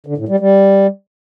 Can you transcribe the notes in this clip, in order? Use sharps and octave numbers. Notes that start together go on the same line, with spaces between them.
D3
A2
G3
G3